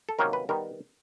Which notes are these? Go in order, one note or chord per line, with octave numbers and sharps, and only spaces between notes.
A4
C3 D#3 F#3 A#3 C#4 A#4
B4
D#3 G3 B3 A#4